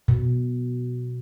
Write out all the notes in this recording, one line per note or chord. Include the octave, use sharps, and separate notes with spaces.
B2